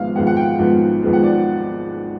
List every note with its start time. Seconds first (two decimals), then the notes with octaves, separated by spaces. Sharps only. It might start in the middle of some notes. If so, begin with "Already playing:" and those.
Already playing: G#1 G#2 F3 G#3 B3 F5
0.15 G#1 G#2 F3 G#3 B3 F#5
0.27 F#5
0.37 G5
0.59 G#1 G#2 F3 G#3 B3
1.03 G#1 G#2 F3 G#3 B3
1.13 F#5
1.23 D5